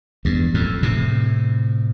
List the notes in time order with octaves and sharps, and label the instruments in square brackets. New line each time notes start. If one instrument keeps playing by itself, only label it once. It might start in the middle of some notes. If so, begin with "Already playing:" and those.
[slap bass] E2 G2
F2 A2
A2 C3